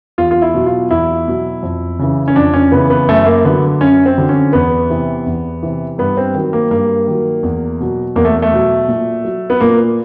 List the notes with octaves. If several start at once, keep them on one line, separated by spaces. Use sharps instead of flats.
E2 F4
F4
E4
B2 F#3
F4
E2 E4
B2 F#3
F2
C#3 E3
C#4
F2 D4
C#4
C#3 E3 B3
B3
F#2 A3
A#3
D3 F#3 B3
F#2 C#4
C4
D3 F#3
C#4
E2 B3
C3 E3
E2
C3 E3
G2 B3
C4
D#3 F#3
A#3
G2 A#3
D#3 F#3
E2
B2 F#3
E2 A#3
A3
A3
B2 F#3
A#2
F#3
B3
A#2 A#3